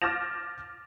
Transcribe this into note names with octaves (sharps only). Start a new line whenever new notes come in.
D6 F6 G6 A6 A#6 E7